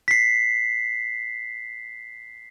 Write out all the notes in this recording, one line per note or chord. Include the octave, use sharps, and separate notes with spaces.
B6 C7